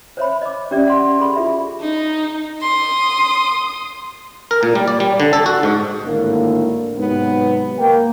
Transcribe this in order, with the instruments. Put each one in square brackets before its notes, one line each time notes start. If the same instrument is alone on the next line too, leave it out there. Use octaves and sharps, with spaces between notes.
[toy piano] C5 C#5 E5 B5
D#5 D6
C#4 G4 D5 E5
F#5 C6
G#4 A4 B5 C#6
F4 G#4 E5
[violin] D#4
C6 D#6
[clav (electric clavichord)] A#4
A#2
G3
D5
G3
D3
A4
F#4
G#2
[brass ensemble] G#1 A2 D3 A#3
G#2 C3 F#3 B3
A#3 G5